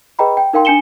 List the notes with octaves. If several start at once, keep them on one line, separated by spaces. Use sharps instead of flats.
G#4 B4 D#5 G5 A#5 B5
G5
D#4 A#4 F5 G5 C6
D4 G#5 C#7 E7 G7